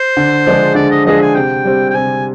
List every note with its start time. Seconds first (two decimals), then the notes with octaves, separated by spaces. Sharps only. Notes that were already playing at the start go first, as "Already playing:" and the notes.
Already playing: C5
0.17 D3
0.46 F3 G#3 D4 G#4
0.75 D3 D5
0.91 D#5
1.05 F3 G#3 D4 G#4 D#5
1.20 G#5
1.35 C3 G5
1.65 G3 C4
1.90 G5
1.94 C3 G#5